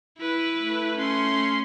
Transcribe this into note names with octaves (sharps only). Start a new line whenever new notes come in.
E4 B4
A3
C#4 C6